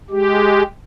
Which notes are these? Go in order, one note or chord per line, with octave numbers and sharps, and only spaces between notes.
G#3 G4